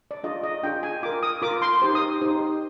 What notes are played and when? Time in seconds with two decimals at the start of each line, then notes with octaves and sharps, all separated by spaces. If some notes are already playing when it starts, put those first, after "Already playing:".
0.11 D5
0.23 D4 F4 G#4 D#5
0.44 D#5
0.63 D4 F4 G#4 G5
0.83 G#5
1.03 F4 A#4 D6
1.23 D#6
1.42 F4 A#4 D6
1.62 C6
1.82 D#4 G4 C5
1.95 D#6
2.21 D#4 G4 C5